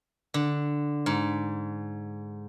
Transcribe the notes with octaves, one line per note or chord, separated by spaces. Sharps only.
D3
G#2